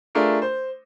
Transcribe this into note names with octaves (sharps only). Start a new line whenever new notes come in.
A3 D4 F4 G#4 A#4
C5